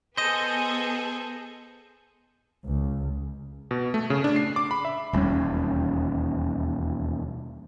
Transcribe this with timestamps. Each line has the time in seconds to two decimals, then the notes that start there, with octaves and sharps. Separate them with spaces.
0.17 B3 G#4 A4 C5 D#5 G6 D#7 E7
2.66 C#2
3.71 B2
3.94 A3
4.10 C#3
4.24 D4
4.36 C7
4.56 D6
4.71 B5
4.85 E5
5.13 E1 D#2 G3 C#4